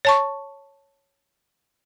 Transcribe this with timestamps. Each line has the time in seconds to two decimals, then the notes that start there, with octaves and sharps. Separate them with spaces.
0.05 C#5 A5 C#6